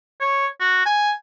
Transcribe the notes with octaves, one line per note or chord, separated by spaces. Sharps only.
C#5
F#4
G#5